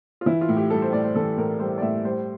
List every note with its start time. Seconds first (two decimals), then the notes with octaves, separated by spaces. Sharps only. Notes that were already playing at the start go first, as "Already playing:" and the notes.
0.21 F4
0.26 E3 E4
0.41 F4
0.49 A2
0.57 G4
0.70 G3 A4
0.82 C5
0.93 A2 D5
1.04 C5
1.15 E3 A4
1.37 A2 A#4
1.60 G3 C5
1.78 D5
1.82 A2 E5
2.04 G3 C5